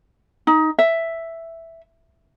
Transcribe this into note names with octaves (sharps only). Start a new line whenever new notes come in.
D#4
E5